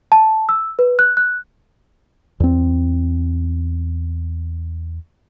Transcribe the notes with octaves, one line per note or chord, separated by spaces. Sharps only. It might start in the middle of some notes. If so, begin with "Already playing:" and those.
A5
E6
B4
F#6
F#6
E2 C4